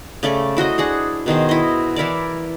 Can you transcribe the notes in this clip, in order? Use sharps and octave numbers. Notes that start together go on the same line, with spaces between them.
C#3 A3 D5 D6
E4 F#4 C5 D#5
D4 G#4 F#5
B2 D#3 G#4 C5
E4 D#5
E3 E4 A#4 D5